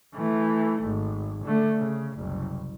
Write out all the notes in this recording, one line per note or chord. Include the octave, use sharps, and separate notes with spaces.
E3 A3
G#1
D3 A3
C#3
F#1 C2